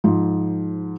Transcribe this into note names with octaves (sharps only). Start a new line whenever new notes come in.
G#2 F3